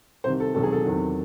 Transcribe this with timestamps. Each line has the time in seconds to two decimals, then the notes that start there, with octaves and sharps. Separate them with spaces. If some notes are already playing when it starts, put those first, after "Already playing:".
0.24 C2 C3 D#3 C5
0.40 A4
0.54 E1 E2 C3 D#3 F#3 A4
0.63 G#4
0.72 A4
0.85 E2 C3 D#3 F#3